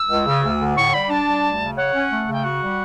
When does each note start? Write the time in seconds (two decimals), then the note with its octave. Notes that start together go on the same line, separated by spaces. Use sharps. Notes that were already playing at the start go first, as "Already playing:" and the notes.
Already playing: E6
0.09 C#2
0.26 C#3
0.43 D2
0.60 D3
0.76 A2 C#6
0.94 G3 B5
1.10 D4 A5
1.26 G3
1.44 D2
1.60 C#3
1.77 C#5 F#5
1.93 C#4
2.11 A3
2.27 C#3
2.33 G5
2.44 F#4 F#5
2.61 G3